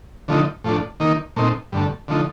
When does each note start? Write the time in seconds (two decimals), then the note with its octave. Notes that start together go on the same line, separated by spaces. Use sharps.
0.28 D3 F3 A3 D#4
0.64 A2 F3 A3 D4
1.00 D#3 A#3 D#4
1.36 A#2 A3 C4 D#4
1.72 G2 D3 A3
2.08 D3 F3 A3 D#4